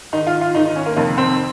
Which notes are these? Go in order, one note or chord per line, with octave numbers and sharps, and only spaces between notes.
G#2 D#3 D#4
F4
F4
G#2 D#3 D#4
D#4
C#4
A#3
F2 C3 D#3 A#3
C4